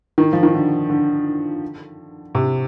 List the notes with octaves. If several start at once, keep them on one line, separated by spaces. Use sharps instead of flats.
D#3
F3
D#3
D3
D3
C3